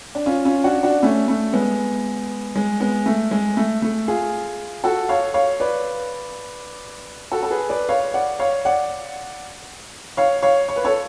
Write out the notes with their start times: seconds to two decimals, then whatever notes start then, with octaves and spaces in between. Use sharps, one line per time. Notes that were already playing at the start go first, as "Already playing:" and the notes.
0.15 D4
0.26 C#4 F4
0.45 C#4 F4
0.64 D4 F#4
0.83 D4 F#4
1.03 A3 C#4
1.28 A3
1.53 G#3 B3
2.56 G#3
2.80 G#3 B3
3.06 A3
3.31 G#3
3.57 A3
3.82 A3
4.08 F4 G#4
4.84 F#4 A4
5.09 C#5 F5
5.34 C#5 F5
5.60 B4 D5
7.32 F#4 A4
7.43 A4
7.50 G#4 B4
7.69 B4 D5
7.89 C#5 F5
8.14 D5 F#5
8.39 C#5 F5
8.65 D5 F#5
10.17 C#5 F5
10.43 C#5 F5
10.69 C#5
10.76 B4
10.84 A4 C#5